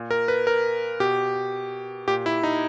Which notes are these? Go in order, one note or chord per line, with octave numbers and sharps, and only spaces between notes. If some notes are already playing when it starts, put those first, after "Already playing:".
Already playing: A#2
A#4
B4
A#4
B2 G4
A#2 G4
E4
D#4